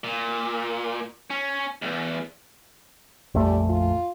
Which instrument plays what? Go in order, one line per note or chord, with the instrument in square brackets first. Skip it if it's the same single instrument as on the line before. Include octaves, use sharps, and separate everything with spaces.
[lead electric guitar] A#2
C#4
B1 E2
[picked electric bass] A#1 F2 A3 [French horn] G3
[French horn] F4